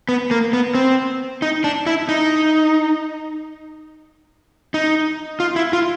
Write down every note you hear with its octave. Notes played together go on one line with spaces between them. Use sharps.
B3
A#3
B3
C4
D#4
D4
E4
D#4
D#4
F4
E4
F4